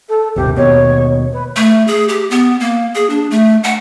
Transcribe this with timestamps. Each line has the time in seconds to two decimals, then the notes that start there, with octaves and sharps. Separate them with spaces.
0.09 A4
0.36 D#1 G#1 C3 G4
0.57 D#2 B2 C#5
1.33 B4
1.56 A3
1.88 G#4
2.09 G4
2.31 B3
2.60 A#3
2.95 G#4
3.10 D4
3.31 A3
3.64 F#5